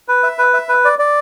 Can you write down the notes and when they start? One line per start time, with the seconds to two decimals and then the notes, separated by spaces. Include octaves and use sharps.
0.08 B4
0.23 E5
0.38 B4
0.54 E5
0.69 B4
0.85 D5
0.99 D5